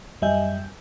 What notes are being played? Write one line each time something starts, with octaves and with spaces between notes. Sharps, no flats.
F#2 G3 D#5 E5 G#5 G6